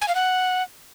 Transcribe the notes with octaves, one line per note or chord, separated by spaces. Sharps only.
G#5
F5
F#5